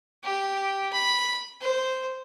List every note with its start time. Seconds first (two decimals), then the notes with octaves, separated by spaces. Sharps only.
0.23 G4
0.92 B5
1.61 C5